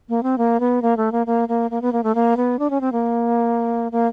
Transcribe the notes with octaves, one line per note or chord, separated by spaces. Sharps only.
A#3
C4
A#3
B3
A#3
A3
A#3
A#3
A#3
A#3
B3
A#3
A3
A#3
B3
D4
C#4
C4
A#3
A#3